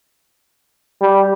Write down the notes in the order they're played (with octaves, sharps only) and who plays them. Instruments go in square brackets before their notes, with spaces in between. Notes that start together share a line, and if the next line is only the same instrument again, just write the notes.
[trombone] G3